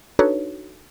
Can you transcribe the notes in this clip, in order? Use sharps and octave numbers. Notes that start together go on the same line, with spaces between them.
D4 D#4 F#4 A4 B4 C#5